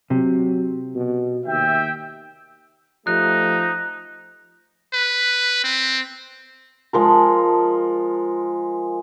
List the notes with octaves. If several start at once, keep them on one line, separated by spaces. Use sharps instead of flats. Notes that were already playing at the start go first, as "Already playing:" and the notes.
C3 F#3
B2
D#2 E5 G5
F3 A3 D#4 G4 F#6
B4
C4
F3 G#3 A#4